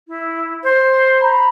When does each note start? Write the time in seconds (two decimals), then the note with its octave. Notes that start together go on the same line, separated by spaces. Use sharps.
0.08 E4
0.64 C5
1.22 A#5 B5